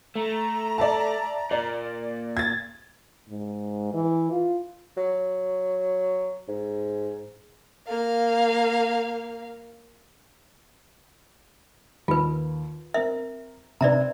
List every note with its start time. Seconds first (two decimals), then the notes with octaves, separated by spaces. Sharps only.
0.16 A3 A#5
0.78 D5 E5 A5
1.51 A#2 D5
2.37 G#6 A6
3.29 G#2
3.93 E3
4.31 F4
4.97 F#3
6.48 G#2
7.88 A#3 F5
12.08 D#2 F4 B4
12.94 C4 A#4 E5
13.81 C3 D#4 B4 D5 E5 A#5